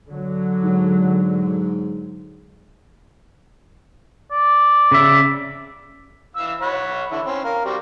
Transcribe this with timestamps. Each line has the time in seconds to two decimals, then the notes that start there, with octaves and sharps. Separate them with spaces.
0.10 D3 F#3
0.63 G#2
4.31 D5
4.91 C#3 E5
6.36 E3 F5 E6
6.62 C#5 F#5 B5
7.11 D3 E3 E4
7.26 C4 C#4
7.44 A#4 F5
7.65 G3 C4 F#4